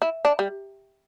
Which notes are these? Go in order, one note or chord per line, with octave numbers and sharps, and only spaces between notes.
E4
D4
G3